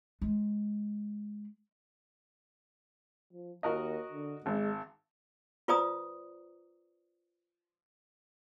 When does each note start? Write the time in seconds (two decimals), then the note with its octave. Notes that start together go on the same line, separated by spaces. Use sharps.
0.22 G#3
3.33 F3
3.63 D#2 F#4 A#4 D#5
4.11 D3
4.46 G#1 G#3
5.68 F4 B4 C5 D5 A#5 D#6